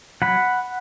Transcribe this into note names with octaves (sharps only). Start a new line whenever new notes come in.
F#3 F#5 B5